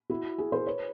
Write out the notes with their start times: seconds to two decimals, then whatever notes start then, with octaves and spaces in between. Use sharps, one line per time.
0.10 E4 F#4
0.38 F#4 G#4
0.52 A#4 C5
0.66 B4 C#5